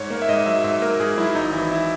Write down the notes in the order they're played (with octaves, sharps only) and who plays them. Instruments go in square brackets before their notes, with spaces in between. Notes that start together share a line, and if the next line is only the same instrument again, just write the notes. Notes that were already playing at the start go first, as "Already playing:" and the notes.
Already playing: [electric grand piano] G#2 C#5
A#3 C#5
E5
G#2 D#5
F#3 E5
G#2 E5
A#3 A#4
G#2 G#4
F#3 E4
G#1 D#4
E3 E4
E4